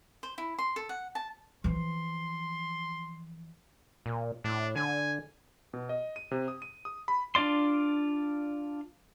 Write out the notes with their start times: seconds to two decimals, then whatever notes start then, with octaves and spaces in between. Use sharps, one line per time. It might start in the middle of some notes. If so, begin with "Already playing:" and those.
0.23 C5
0.38 E4
0.59 C6
0.76 A4
0.89 F#5
1.15 A5
1.64 E3 F3 C6
4.06 A#2
4.44 A2 D4
4.76 D3 G#5
5.73 B2
5.89 D#5
6.16 D#7
6.31 C3
6.48 D#6
6.62 D#7
6.85 D#6
7.08 B5
7.35 D4 F4 D5 C6